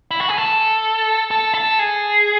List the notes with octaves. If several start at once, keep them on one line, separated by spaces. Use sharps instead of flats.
E4
F#4
G#4
A4
A4
A4
G#4